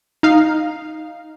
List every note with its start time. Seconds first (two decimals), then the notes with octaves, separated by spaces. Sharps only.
0.23 D#4 F5